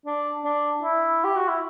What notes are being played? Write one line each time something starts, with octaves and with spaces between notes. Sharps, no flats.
D4
D4
E4
G4
F#4
E4